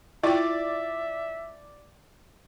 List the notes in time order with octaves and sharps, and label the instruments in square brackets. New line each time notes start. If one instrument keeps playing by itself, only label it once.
[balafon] E4 F4 G5 [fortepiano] D5 [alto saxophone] E5